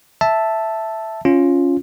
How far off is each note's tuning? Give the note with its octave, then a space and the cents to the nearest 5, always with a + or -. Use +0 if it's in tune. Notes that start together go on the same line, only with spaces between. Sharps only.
E5 +0 A5 +0
C#4 +0 F4 +0